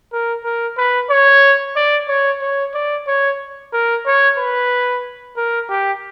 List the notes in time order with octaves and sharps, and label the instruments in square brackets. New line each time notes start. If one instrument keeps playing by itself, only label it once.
[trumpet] A#4
A#4
B4
C#5
D5
C#5
C#5
D5
C#5
A#4
C#5
B4
A#4
G4